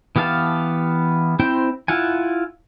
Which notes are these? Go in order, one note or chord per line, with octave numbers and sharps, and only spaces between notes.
E3 B3 G4 F5 A5
C4 E4 C5 G5
E4 F4 F#5 G#5